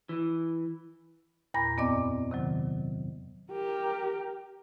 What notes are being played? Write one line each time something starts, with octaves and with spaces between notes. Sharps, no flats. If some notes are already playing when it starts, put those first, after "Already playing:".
E3
E2 A#2 A#5 B5 A#6
F#2 B3 C4 D5 D#5 D6
C3 D#3 F#3
G4 A#4